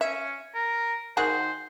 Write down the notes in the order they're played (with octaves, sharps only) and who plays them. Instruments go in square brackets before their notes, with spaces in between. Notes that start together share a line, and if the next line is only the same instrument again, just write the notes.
[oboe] C#4 [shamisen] E5
[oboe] A#4
[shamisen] D#3 F#4 G#4 [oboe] C5